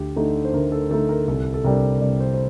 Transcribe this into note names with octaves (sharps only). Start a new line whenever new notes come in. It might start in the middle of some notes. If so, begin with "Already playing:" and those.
Already playing: D2 G4
D3 A3 D#4
C5
D2 A#4
A4
D3 A3 D#4 A4
A#4
C2 A4
A4
C3 G3 D4 A#4
C2 D5
C5
C5